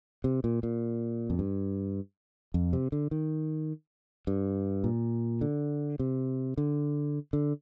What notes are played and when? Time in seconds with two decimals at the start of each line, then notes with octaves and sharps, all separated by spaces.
0.24 C3
0.44 A#2
0.63 A#2
1.30 F2
1.39 G2
2.54 F2
2.73 C3
2.92 D3
3.11 D#3
4.27 G2
4.84 A#2
5.41 D3
5.99 C3
6.58 D3
7.33 D3